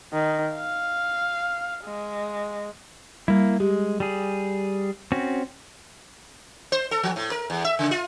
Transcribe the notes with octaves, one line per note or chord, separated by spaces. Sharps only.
D#3
F5
G#3
G3 A#3 E4
G#3 G4
G3 G#4
C4 C#4 F#4
C5
A4
F3
A2
A#4
E2
E5
C#3
F4